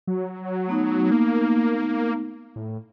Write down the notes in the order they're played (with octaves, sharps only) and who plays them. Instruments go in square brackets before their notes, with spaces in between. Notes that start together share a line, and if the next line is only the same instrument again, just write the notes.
[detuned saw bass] F#3
[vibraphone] A3 B3 D#4
[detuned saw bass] A#3
A2